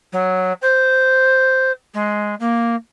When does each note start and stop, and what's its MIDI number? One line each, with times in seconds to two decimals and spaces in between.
0.12 0.53 54
0.62 1.71 72
1.94 2.35 56
2.39 2.75 58